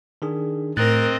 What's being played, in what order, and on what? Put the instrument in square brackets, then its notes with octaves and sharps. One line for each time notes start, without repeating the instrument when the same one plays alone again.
[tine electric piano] D#3 D4 G#4
[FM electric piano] A2 [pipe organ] C4 D#5 [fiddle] A#4 [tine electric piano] F#6 A6